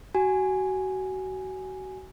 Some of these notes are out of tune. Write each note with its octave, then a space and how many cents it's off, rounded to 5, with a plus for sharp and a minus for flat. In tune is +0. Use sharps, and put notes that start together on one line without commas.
F#4 +30 G#5 +0